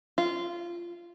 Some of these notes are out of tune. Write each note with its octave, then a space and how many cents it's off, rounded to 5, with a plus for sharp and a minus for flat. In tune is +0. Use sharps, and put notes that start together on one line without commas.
F4 -15